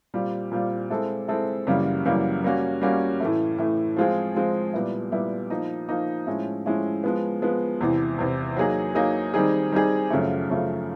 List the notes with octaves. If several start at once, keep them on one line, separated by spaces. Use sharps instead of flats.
A#2 G3 C4 F4
A#2 G3 C4 F4
G#3 C4 E4 A4
G#3 C4 E4 A4
F#2 C#3 E3 G3 A#3
F#2 C#3 E3 G3 A#3
G3 A#3 C#4 F#4
G3 A#3 C#4 F#4
A2 E3 A3
A2 E3 A3
F3 G#3 C4 F4 G#4
F3 G#3 C4 F4 G#4
A#2 G3 B3 E4
A#2 G3 B3 E4
F3 A#3 D#4
F3 A#3 D#4
A2 F3 G#3 C#4 E4
A2 F3 G#3 C#4 E4
F3 G#3 B3
F3 G#3 B3
E2 C3 E3
E2 C3 E3
F#3 A#3 D#4 G#4
F#3 A#3 D#4 G#4
D#3 G3 C4 D#4 G#4
D#3 G3 C4 D#4 G#4
F#2 C#3 F3 A3
F#2 C#3 F3 A3